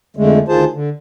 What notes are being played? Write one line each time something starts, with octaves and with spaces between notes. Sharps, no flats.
F2 D3 G#3 A3
D2 D#3 F4 G#4 C5 A5
D3